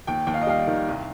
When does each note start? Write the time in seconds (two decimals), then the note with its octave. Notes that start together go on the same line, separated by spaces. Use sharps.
0.07 D#2 G5
0.27 D#2 G5
0.34 F5
0.42 D#5
0.47 G3 F5
0.67 D#3
0.88 C2